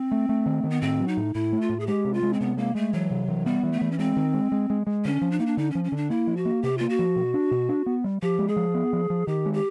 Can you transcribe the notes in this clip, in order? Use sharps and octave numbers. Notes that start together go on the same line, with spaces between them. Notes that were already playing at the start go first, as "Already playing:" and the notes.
Already playing: C4
A3
A3
D#3
D#3
B3
A2 C4
F#3
D#4
A2
A2 E4
A3
F4
A2
G#4
G#3 G4
C3
F4
G#3
C4
C3 B3
G#3 A#3
G#3 A3
E3 F#3
C3
E3
G3 B3
E3
A3
E3
C#4
G#3 C4
D#3
G#3
G#3
G#3
G#3
D3 C#4
F3
D4
A#3 D#4
D4
D3 D#4
F3 C#4
C#4
D3 D4
A#3 E4
F3
F#4
A#3
C3 G4
A#3 F4
F#4
F3
B2
D4
B2
D4
B3
G3
F3 G4
G#3
G#4
F3
B3
F3
F3
D#3 G4
G#3
G4